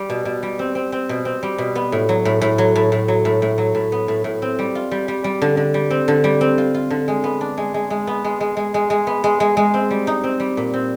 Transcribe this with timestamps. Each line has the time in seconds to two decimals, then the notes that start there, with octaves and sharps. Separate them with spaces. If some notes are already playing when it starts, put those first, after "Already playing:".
Already playing: G3
0.10 B2
0.25 B2
0.43 G3
0.59 C4
0.75 C4
0.92 C4
1.09 B2
1.25 C4
1.43 G3
1.58 B2
1.75 B3
1.92 A2
2.09 F#3
2.25 A2
2.41 A2
2.58 F#3
2.76 A2
2.92 A2
3.08 F#3
3.25 A2
3.42 A2
3.58 F#3
3.75 A2
3.92 B3
4.08 A2
4.24 A2
4.42 C4
4.59 G3
4.75 F4
4.91 G3
5.08 G3
5.24 G3
5.42 D3
5.57 D3
5.74 G3
5.90 C4
6.08 D3
6.24 G3
6.41 C4
6.58 F4
6.74 F4
6.90 D3
7.08 G#3
7.24 B3
7.41 D4
7.58 G#3
7.74 G#3
7.90 G#3
8.07 B3
8.24 G#3
8.40 G#3
8.57 G#3
8.74 G#3
8.90 G#3
9.07 B3
9.24 G#3
9.40 G#3
9.57 G#3
9.74 C4
9.90 G3
10.07 D#4
10.24 C4
10.40 G3
10.57 A#2
10.74 C4